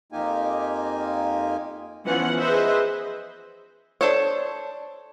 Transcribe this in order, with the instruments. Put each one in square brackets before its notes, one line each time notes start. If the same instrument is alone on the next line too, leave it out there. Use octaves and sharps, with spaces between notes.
[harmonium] F2 A#3 D#4 F4 G4 G#5
[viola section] E3 F3 B3 C#4 F#5
G#4 B4 C5 D#5 E5
[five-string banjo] D4 A4 C5 C#5